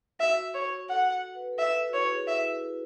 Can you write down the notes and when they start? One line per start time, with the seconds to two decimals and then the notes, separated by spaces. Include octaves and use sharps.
0.20 F#4 E5
0.54 C#5
0.89 A4 F#5
1.35 B4
1.53 A4
1.58 B4 E5
1.76 A4
1.89 F#4
1.93 E4 C#5
2.11 G#4
2.28 E4 E5